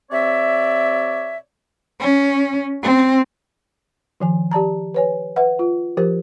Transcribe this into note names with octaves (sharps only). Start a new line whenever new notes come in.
C3 C4 C#5 D5 E5
C#4
C4
D#3 F3 G#5
G4 D5 A5 A#5
B4 C#5 G#5
B4 E5 F#5
F4
F3 G4 A#4 C5